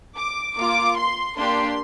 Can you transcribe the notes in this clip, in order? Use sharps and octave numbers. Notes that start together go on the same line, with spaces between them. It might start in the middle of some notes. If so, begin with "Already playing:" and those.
D6
A#3 F4 D6
C6
A#3 D4 G4 C6